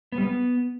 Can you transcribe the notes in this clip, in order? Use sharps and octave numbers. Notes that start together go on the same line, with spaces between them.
B3
G3
B3